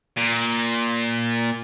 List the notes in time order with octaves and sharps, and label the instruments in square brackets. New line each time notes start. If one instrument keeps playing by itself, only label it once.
[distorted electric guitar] A#2